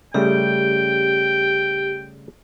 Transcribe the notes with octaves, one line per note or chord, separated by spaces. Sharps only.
C#3 G3 A3 G4 G5